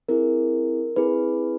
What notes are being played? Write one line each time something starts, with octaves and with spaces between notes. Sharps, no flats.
C4 E4 G#4 A#4
C4 E4 G#4 B4